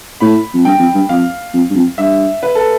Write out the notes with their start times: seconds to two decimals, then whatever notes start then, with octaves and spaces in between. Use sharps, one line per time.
0.20 A2 B5
0.54 F2
0.65 G2 G5
0.79 F2
0.95 G2
1.09 F2 F5
1.54 F2
1.70 G2
1.75 F2
1.98 G2 E5
2.43 B4
2.55 A4